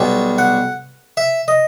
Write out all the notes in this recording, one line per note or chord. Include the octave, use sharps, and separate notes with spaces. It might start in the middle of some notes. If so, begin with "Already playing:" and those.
Already playing: B1 B2 G3
F#5
E5
D#5